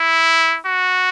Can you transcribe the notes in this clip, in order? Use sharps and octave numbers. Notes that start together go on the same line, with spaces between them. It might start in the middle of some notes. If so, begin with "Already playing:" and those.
Already playing: E4
F#4